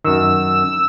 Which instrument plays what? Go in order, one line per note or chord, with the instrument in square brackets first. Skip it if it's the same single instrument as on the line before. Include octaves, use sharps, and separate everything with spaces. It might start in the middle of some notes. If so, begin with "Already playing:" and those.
[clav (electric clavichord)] F#2 D#3 [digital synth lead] E6